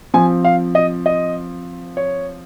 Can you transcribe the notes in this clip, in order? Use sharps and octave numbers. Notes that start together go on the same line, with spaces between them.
F3 C4 G#5
F5
D#5
D#5
C#5